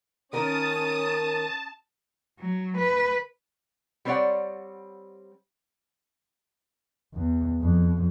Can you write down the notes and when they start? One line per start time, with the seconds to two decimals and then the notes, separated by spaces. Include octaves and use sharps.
0.33 D#3 C#4 A#4 A5 D#6
2.39 F#3
2.77 B4
4.05 G3 C4 B4 C#5 D5 F#5
7.14 E2
7.61 F2